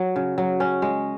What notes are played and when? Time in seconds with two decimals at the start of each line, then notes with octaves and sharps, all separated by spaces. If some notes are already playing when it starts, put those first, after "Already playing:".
Already playing: F#3
0.16 C#3
0.38 F#3
0.60 C#4
0.82 G#3